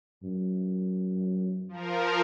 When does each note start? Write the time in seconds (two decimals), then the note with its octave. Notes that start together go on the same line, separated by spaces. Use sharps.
0.23 F#2
1.69 F3 A#4